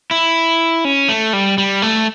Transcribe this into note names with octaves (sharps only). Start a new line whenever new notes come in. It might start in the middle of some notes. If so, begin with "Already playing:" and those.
E4
C#4
A3
G3
G3
A3